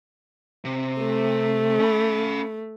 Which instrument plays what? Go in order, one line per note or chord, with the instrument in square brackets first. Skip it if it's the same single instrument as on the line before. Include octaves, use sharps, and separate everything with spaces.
[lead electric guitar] C3
[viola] A3
[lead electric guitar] C#4 B5